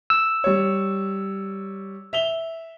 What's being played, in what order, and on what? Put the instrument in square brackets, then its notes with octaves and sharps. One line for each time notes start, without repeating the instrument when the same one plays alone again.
[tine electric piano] E6
[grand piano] G3 C#5
E5 F7 G7